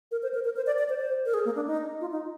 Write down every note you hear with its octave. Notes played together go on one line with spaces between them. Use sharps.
A#4
C5
A#4
A#4
C5
D5
D5
C5
C5
A#4
G#4
A#3
D4
D#4
F4
D#4